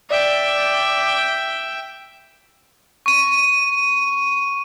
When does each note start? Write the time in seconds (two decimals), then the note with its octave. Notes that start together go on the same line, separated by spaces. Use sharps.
0.10 D5 E5 G5
3.06 C#6 D#7